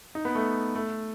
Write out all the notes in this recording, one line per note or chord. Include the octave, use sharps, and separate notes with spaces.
D#4
B3
A3
A3